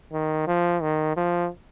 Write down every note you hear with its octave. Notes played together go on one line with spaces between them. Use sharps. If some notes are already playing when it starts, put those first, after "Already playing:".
D#3
F3
D#3
F3